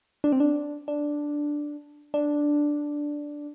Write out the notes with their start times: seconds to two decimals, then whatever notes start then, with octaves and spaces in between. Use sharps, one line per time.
0.24 D4
0.32 C4
0.40 D4
0.88 D4
2.14 D4